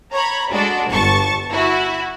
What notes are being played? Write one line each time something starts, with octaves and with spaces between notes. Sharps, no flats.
C#5 A#5 B5
G#3 D4 F#4 A4
G1 A5 C#6 A6
E4 F#4